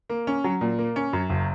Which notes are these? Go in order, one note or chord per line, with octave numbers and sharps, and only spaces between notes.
A#3
C#4
F#3
A#2
A#3
C#4
F#2
F#1